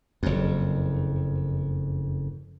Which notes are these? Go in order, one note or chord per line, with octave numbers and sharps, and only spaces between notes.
F#1 F2